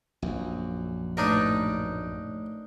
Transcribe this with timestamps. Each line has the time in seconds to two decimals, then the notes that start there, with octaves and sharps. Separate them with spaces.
0.22 A#1 F#2
1.17 A1 A2 D4 D#4 A#4 B4